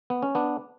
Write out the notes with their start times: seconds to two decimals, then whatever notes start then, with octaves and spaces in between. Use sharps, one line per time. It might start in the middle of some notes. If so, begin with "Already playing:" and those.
0.10 B3
0.22 C#4
0.35 B3 D4